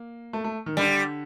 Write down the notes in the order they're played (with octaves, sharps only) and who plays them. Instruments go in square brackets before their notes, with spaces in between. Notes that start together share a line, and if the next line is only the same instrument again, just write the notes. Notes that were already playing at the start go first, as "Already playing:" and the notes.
Already playing: [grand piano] A#3
A3
A3
D#3
[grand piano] D3 [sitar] G3